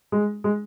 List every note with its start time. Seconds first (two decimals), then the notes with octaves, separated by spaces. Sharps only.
0.12 G#3
0.44 G#3